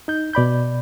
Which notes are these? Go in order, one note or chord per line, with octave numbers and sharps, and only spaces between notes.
D#4 G6
B2 D5 B5 G6